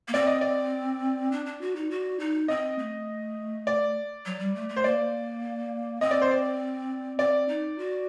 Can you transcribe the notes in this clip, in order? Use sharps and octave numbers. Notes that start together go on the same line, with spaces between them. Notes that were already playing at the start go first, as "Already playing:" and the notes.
A#3
C4 D5
D#5
D5
D4
D4
F#4
D#4
F#4
D#4
C4 D#5
A3
D5
F#3
G3
A3
A3
C5
A#3 D5
C4 D#5
D5
C5
D5
C4 D5
D#4
F#4